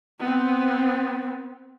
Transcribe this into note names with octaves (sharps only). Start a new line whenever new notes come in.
B3 C4